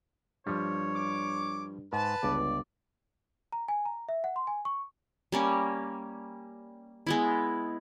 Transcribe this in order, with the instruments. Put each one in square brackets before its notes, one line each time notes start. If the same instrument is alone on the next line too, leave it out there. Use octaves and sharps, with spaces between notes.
[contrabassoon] G2 [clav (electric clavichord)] F3 G3 [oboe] C#5
[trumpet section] D6
[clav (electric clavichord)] G#2 [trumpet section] B4 A5
[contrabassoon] G1 [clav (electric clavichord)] C#2 [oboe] D5
[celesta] A#5
G#5
A#5
E5
F#5
C6
G#5
C#6
[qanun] G3 A#3 C#4
G#3 B3 E4